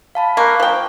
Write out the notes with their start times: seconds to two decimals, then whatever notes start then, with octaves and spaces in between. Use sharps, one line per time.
0.15 F5 A5 B5
0.37 A#3 C#6 F#6
0.60 F3 G5